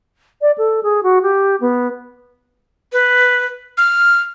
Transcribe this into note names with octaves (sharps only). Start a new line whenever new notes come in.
D5
A4
G#4
F#4
G4
B3
B4
F6